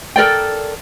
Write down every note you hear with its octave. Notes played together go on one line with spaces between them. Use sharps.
A4 A#4 D5 G5